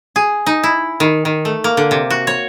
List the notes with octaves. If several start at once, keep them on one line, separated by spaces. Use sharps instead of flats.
G#4
D#4
E4
D#3
D#3
A3
A#3
D3
C3
F#4
C#5